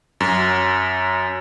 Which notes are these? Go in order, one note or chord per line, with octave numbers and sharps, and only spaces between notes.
F#2